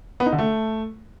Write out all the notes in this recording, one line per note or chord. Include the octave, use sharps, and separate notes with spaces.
B3
D#4
D3
A3